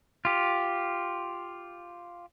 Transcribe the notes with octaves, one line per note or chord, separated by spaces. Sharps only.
F4 G4